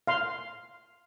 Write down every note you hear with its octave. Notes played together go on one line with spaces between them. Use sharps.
F5 C6